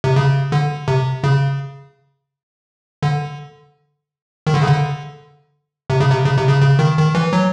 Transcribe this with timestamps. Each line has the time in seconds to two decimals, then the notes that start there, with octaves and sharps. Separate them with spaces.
0.04 C3
0.16 C#3
0.52 D3
0.88 C3
1.24 C#3
3.03 D3
4.47 D#3
4.54 D3
4.61 C#3
4.68 D3
5.90 C3
6.00 C#3
6.11 C3
6.26 C#3
6.37 C3
6.49 C#3
6.62 C#3
6.79 D#3
6.97 D#3
7.15 E3
7.33 F#3